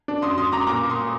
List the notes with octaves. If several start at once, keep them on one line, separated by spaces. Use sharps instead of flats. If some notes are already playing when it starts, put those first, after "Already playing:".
D4
F#2 C6 D#6
F#2 C6 D#6
F#2 A#5 D6
A#2 A#5 D6
A#3
C6 D#6